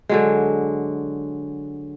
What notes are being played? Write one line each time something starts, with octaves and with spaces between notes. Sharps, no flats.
D3 F#3 G#3